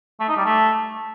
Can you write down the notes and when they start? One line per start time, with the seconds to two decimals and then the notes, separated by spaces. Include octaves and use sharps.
0.20 A3
0.29 D#4
0.37 G3
0.46 A3